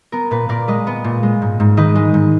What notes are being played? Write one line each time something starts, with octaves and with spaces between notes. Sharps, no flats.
B3 A#4
A#2 B4
A#2 A#4 D5
G#3 B4 D#5
B3
A#2
G#3
G#2
G#2
D#3 B4 D#5
G#3
G#2